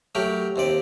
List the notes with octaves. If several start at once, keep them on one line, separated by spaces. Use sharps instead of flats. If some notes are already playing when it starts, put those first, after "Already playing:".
F#3 A3 G4 A#4
D#2 C3 D5